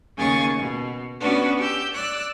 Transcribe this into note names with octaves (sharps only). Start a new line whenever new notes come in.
D#2 C#3 G#4 G#5 C#6 A6
B2
B3 C#4 D4 F#4 B4
G4 E6 G6
D5 E6 F#6